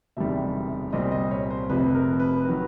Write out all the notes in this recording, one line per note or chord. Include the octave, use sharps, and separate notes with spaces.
E1 D2 C3 D#3 G3 E5
C2 A#2 G3 C4 D#5
D#5
C#5
C5
F1 F2 C3 F3 B4
A#4
B4
D#3 F#3 B4